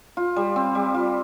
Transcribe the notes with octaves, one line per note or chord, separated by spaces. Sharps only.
F4
G3
C4
G3
F4